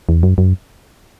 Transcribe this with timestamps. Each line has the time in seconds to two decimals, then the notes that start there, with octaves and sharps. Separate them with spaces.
0.09 E2
0.23 F#2
0.38 F#2